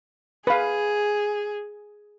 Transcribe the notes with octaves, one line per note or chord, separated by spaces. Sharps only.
G#4 B4 F5